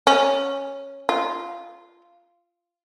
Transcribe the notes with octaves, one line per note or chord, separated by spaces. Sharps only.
C#4
F4